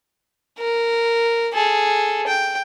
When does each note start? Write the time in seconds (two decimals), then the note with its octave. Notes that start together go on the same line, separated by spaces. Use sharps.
0.59 A#4
1.54 G#4 A4
2.27 G5